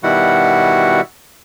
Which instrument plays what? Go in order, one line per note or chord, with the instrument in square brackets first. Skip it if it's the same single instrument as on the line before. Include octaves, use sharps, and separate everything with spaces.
[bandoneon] B2 D#3 G3 E4 F#4 F#5